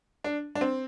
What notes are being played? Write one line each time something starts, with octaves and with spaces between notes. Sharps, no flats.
D4
D4
C4